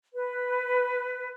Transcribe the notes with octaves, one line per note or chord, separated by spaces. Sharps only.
B4